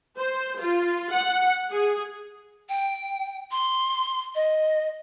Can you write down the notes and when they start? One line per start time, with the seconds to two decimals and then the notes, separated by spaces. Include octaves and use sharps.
0.18 C5
0.59 F4
1.11 F#5
1.71 G#4
2.69 G5
3.51 C6
4.35 D#5